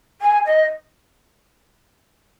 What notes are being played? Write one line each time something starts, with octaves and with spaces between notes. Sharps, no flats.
G#5
D#5